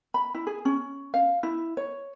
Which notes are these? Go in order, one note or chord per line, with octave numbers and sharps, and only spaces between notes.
B5
E4
G#4
C#4
F5
E4
C#5